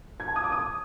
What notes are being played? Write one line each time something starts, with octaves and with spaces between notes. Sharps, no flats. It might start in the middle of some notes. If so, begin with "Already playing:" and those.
G#6
A5
D#6
D6
D#6